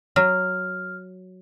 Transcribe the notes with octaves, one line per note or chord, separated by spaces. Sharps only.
F#3 F6